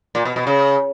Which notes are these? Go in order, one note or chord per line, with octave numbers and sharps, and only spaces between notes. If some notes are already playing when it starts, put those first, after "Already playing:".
A#2
B2
B2
C#3